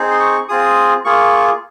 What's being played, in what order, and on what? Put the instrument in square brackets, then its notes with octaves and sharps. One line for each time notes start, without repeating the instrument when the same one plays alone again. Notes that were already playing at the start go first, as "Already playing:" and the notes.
Already playing: [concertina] C4 D#4 G#4
C6
C#6
C4 F4 G#4 D#6
A#3 F4 G#4 C#6